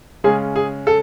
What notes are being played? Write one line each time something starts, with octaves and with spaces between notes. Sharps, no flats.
C#3 G#3 C#4 G#4
G#4
A4